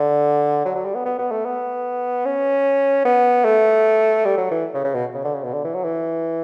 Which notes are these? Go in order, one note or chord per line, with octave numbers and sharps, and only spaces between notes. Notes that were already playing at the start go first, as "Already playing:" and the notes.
Already playing: D3
F#3
F#3
G3
B3
B3
B3
A3
B3
C#4
B3
A3
G3
F#3
E3
C#3
C#3
B2
C#3
D3
C#3
B2
D3
E3
F#3
E3